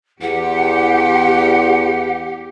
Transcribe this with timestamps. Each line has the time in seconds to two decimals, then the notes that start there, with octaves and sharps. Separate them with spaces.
0.22 E2 G4 F#5